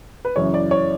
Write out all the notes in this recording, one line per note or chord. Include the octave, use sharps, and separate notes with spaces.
B4
F#2 C#3 E3 C#5
D5
C#5